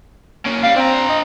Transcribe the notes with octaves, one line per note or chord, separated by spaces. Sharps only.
A#3 C#4
G3 F5
C4 D4 A#5
D#5